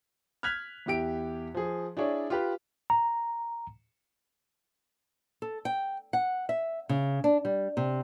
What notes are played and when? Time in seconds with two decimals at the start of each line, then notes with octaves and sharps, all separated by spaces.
0.43 F6 F#6 G#6 B6 F7
0.86 E2 E4 G4 D7
1.54 F3 G#4
1.97 D4 E4 G#4 C#5 D5
2.30 F4 G4 B4
2.90 A#5
5.42 A4
5.65 G5
6.13 F#5
6.49 E5
6.89 C#3
7.24 D4
7.45 G3
7.77 C3